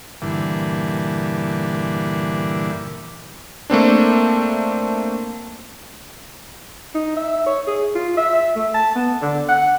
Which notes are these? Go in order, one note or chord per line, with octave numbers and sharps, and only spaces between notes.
G2 A#2 D3 E3
A3 A#3 C4 D4
D#4
E5
C#5
G#4
F4
E5
A3
A5
B3
D3
F#5